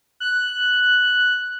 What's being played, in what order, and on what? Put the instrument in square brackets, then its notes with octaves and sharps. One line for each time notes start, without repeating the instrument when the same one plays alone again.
[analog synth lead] F#6